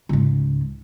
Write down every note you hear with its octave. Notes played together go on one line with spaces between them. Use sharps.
C#2 G#2